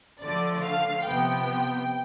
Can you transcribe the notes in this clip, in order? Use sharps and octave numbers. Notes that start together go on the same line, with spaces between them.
D3 F3 A3 D5
F5
C3 F3 B3 G5